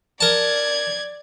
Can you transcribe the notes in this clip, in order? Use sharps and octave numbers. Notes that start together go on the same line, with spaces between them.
A#4 D5 A5 G#6